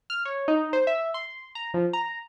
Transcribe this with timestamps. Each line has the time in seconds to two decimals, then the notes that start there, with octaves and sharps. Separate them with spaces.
0.10 F6
0.25 C#5
0.48 D#4
0.73 C5
0.87 E5
1.14 C6
1.55 A#5
1.74 F3
1.93 A#5